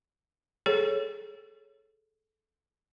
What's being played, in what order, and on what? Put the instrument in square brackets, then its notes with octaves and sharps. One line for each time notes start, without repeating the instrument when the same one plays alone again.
[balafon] G#4 A4 C#5